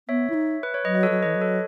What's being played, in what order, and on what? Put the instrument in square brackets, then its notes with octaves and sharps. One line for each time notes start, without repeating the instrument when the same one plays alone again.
[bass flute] B3 [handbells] C#5 E5
[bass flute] E4
D#4
[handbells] B4
C#5
[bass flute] F#3 [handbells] B4 D#5
[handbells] D#5
A4 C#5
[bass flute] F#3
[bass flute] E3 [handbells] B4 D#5
[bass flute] F#3
[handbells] A4 C#5